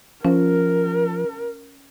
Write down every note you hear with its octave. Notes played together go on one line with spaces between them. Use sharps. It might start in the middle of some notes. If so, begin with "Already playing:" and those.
F3 C#4 A#4